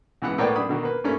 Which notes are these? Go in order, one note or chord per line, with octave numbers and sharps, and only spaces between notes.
C#2 E3 B3 F#5 E6
A2 A#3 B3 C#5 D5 G5
F#2 D4 B5 D#6
B2 D3 D#3 F#4
A#3 B4
G2 A3 A#3 C#4